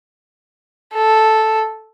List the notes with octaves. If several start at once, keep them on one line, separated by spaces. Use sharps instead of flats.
A4